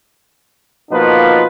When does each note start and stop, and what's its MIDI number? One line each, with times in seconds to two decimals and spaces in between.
0.91 1.45 47
0.91 1.45 53
0.91 1.45 58
0.91 1.45 63
0.91 1.45 65
0.91 1.45 71